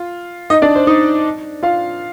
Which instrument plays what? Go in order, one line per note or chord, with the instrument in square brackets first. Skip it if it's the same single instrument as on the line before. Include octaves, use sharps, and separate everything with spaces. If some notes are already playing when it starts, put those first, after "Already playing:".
Already playing: [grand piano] F4
D#4 D#5
D4 D5
C5
D#4 D#5
F4 F5